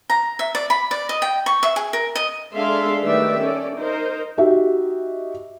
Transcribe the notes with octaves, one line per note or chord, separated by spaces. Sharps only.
A#5
E5
D5
B5
D5
D#5
G5
C#6
E5
G#4
A#4
D#5
G#3 D4 A4 E5 F5 C6
D#3 G3 A3 B4 D5 E5
C#4 A4 D5
D#4 A#4 C5
D#4 F#4 G4 E5